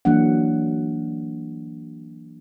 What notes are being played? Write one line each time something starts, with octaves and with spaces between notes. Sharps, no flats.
E3 F#3 A#3 D4 F#5